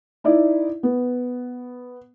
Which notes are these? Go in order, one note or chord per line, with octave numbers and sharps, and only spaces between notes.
D#4 E4 D5
B3